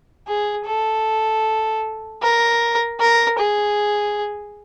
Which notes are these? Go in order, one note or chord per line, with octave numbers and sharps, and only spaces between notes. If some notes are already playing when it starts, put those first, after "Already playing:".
G#4
A4
A#4
A#4
G#4